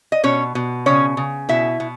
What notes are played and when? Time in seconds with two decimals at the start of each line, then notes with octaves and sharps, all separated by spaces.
0.12 D#5
0.24 B2 C#4 C#5
0.55 B2
0.86 C#3 C#4 C#5
1.17 C#3
1.49 B2 E4 E5
1.80 B2